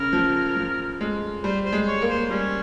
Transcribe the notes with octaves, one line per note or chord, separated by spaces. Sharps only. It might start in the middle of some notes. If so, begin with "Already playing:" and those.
Already playing: C#3 A#4
F3
F3
G#3
G3 C5
C5
G#3
C#5
A#3
C5
G3 C#4